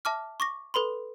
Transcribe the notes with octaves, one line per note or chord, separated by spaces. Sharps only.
E5 A5 D6 F6
C#6 D6 A#6
A4 B4 B5 C6